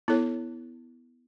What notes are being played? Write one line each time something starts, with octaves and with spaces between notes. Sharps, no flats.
B3 E4 A4 C#5